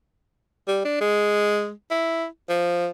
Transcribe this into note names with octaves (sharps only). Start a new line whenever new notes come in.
G3
D4
G#3
E4
F3